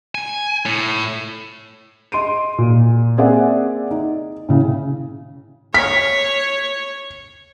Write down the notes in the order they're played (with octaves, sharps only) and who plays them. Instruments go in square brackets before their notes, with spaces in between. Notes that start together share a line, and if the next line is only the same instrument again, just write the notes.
[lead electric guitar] G#5
A2
[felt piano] D#5 C6 D7 D#7
A#2
A#3 C4 G#4 D5 E5 F#5
D#4
A2 C#3
[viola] C#5 [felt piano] B6